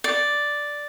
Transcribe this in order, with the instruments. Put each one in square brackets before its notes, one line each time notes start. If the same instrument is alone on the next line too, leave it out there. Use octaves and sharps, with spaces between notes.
[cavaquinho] D5